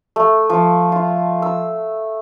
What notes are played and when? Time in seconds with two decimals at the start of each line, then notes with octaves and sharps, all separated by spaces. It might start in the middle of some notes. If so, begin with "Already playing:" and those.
0.16 A3
0.50 F3
0.92 F4
1.42 E6